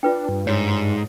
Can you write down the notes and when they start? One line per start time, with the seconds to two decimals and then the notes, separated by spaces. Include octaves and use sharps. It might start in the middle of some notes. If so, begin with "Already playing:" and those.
0.03 D4 F4 B4 G5
0.29 G2
0.47 G#2 C#5